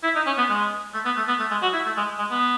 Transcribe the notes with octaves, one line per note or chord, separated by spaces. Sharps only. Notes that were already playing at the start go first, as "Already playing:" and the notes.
E4
D#4
C#4
B3
G#3
A3
B3
A3
B3
A3
G#3
F#4
E4
A3
G#3
G#3
B3